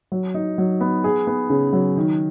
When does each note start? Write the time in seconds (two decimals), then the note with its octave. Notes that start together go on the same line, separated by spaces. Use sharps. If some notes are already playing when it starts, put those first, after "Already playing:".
0.12 F#3
0.34 D#4
0.58 F#3
0.81 B3
1.04 G#4
1.27 B3
1.50 C#3
1.73 F#3
1.97 D#3